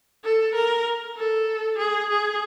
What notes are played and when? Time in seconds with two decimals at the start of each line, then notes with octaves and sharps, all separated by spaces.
0.24 A4
0.55 A#4
1.17 A4
1.78 G#4
2.10 G#4